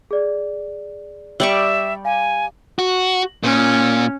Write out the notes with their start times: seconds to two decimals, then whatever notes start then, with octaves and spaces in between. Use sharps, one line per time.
0.11 G#4 D5
1.40 G3 D5 E5 C#6 E6
2.05 F5 G#5
2.79 F#4
3.43 A#2 C#4